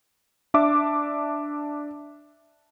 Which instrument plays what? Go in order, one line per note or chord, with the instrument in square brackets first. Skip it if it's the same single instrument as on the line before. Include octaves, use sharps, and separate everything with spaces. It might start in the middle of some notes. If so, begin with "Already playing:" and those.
[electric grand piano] D4 E5 D6